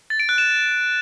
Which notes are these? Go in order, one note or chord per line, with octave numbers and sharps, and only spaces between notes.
A6
D7
F#6
E7